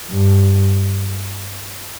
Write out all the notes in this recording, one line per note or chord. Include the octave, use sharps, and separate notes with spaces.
G2